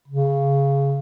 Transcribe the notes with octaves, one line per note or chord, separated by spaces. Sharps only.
C#3